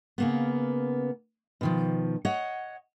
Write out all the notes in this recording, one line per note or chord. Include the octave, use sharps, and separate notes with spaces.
C#3 A#3 B3
B2 D#3 F3
C#5 D#5 F#5